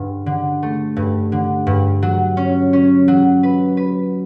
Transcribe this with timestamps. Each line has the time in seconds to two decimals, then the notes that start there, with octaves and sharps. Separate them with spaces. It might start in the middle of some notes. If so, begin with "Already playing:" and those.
Already playing: G2 D3
0.26 D3
0.63 A3
0.96 G2
1.32 D3
1.67 G2
2.02 F#3
2.37 C#4
2.73 C#4
3.08 F#3
3.43 B4
3.77 B4